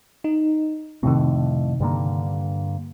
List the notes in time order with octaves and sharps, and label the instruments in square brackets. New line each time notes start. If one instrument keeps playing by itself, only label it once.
[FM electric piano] D#4
[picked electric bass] F2 A2 [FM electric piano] C3 D#3
[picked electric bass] G2 D3 A#3